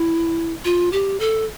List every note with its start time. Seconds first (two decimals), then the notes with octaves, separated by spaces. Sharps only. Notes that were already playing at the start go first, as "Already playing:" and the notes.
Already playing: E4
0.65 F4
0.92 G4
1.20 A4